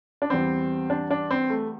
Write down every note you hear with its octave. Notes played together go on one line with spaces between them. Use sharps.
D4
E2 E3 G3 C4
D4
D4
C4
A3